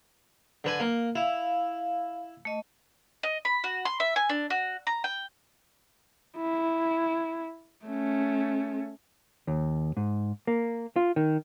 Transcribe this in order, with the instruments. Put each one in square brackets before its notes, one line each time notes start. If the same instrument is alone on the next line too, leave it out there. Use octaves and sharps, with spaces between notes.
[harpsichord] D3 B4 G#5
A#3
[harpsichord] E4 [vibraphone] F5
[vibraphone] A3 D#5
[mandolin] D#5
B5
F#4
C6
E5
G#5
D4
F#4
A#5
G5
[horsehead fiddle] E4
A3 C#4
[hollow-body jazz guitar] D#2
G#2
A#3
F4
D#3